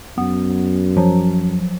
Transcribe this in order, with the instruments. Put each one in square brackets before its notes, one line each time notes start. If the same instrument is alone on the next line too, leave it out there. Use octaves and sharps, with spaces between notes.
[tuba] F#2 [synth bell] B3
[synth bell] F3 F#3